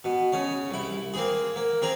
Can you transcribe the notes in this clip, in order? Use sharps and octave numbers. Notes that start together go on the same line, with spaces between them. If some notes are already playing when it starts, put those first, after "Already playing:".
B2
C#3 C#4
C2 E4
A#3 C4 G#4
A#3
C4 G#4 A#5